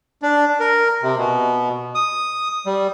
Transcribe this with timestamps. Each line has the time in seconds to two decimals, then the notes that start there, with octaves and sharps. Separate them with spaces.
0.22 D4
0.60 A#4
1.02 C3
1.17 B2
1.95 D#6
2.66 G3